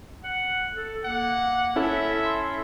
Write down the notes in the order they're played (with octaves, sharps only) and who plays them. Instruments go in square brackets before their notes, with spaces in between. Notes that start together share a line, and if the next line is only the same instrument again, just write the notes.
[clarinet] F#5
A4
[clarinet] A#3 [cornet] F#5
[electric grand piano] C#4 E4 A4 [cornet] E5
[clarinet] C6